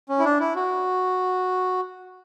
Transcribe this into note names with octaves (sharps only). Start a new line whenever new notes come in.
C#4
E4
D4
E4
F#4